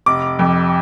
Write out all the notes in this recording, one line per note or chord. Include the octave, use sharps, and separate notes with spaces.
F1 D6
F2